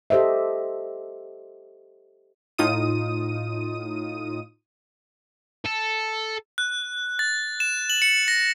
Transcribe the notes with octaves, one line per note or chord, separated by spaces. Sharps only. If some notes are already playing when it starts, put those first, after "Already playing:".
G4 A4 C5 D#5 E5
A2 D#4 F4 D#6 D#7
A4
F#6
A6
E7
F#7
C#7
A#6